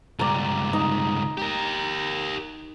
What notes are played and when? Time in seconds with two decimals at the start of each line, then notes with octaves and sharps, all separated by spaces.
0.19 C#2 G2 D5 A#5
0.73 D#4
1.38 G4 A#4